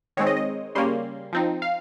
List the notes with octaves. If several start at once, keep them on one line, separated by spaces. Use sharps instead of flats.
D#3 G#3 C4 C#5
D#5
D#5
C#3 G3 A#3 C#4 C6
F3 C4 D#4
F5